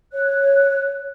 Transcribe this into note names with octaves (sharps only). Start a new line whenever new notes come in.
C#5 F#6